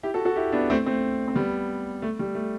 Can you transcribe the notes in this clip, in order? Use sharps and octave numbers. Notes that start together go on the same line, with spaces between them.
E4 G4
F#4 A4
F#4 A4
E4 G4
B3 D4
A3 C4
A3 C4
C4
G3 B3
A3
G3
A3